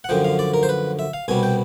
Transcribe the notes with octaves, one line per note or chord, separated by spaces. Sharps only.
F#5
F#2 D3 F3 G5
F5
D5
A#4
C5
B4
E5
F5
C2 B2 G3 G#5
G5